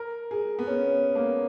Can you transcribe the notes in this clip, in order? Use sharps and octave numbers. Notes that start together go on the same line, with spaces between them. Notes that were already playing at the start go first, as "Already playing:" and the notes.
Already playing: A#4
G#4
B3
C#4
A#3